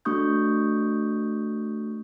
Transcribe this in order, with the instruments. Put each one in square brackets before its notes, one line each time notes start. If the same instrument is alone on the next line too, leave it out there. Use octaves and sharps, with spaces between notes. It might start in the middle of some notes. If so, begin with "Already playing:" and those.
[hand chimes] A3 D4 F#4 C#6 D#6 G6